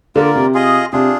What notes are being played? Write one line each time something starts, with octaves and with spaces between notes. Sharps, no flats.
D3 A#3 F4 A#4 D5
C3
F4 G#4 D#5
C3 D4 F4 G#4